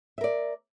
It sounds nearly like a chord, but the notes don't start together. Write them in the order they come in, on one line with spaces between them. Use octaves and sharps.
E5 A#4 D5